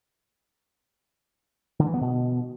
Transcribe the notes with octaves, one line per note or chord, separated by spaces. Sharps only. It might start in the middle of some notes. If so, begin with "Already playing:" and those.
D3
E3
B3
B2